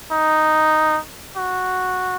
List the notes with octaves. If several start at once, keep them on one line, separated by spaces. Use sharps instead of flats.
D#4
F#4